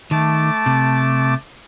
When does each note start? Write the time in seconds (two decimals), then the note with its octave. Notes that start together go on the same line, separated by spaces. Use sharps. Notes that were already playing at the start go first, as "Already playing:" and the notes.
0.11 D#3 A3 A5 D6
0.66 C3